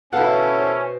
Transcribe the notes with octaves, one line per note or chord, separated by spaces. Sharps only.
B2 C#4 E4 A4 F5 F#5 A5
C5